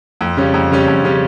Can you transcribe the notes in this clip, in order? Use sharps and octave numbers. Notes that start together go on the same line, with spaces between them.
F2
C#3 G3 C#4
F2
C#3 G3 C#4
F2
C#3 G3 C#4